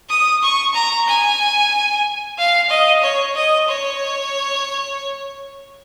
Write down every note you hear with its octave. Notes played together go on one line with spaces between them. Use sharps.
D#6
C#6
A#5
G#5
F5
D#5
C#5
D#5
C#5